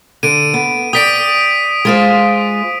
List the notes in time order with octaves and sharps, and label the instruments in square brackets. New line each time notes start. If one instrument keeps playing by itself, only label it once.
[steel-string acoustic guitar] D3 [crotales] D7 D#7
[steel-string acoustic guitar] B3
[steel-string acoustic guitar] D5 G5 [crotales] D#6 B6 D7
[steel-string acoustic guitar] G#3 F4 C5